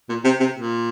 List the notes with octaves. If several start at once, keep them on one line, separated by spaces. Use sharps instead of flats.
A#2
C3
C3
A#2